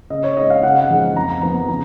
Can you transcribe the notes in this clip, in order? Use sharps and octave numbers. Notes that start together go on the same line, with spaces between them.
C#3 D#5
C#5
G#3 D#4 D#5
F5
C#3 F#5
F#5
F3 G#3 D#4
F2 A#5
F3 B3 D#4 A#5
C#3 A#5